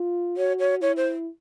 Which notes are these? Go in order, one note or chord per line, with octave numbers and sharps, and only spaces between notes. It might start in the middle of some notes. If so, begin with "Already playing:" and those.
Already playing: F4
F#4 C#5
C#5
E4 C#5
C5